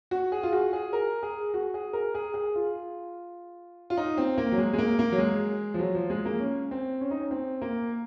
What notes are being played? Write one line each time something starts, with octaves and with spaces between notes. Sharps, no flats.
F#4
G#4
F4
F#4
G#4
A#4
G#4
F#4
G#4
A#4
G#4
G#4
F4
F4
D#4
C4
A#3
F#3
G#3
G#3
A#3
A#3
F#3
G#3
F3
F#3
F3
G#3
A#3
C#4
C4
C#4
D#4
C#4
C4
A#3